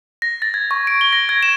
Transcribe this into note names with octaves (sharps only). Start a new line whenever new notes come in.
A#6
A6
G#6
C#6
D7
G7
A#6
G#6
E7